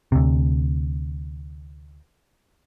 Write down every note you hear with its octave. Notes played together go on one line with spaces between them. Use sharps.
D2 C3